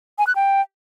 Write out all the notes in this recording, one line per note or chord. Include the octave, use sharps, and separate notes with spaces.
G#5
F#6
G5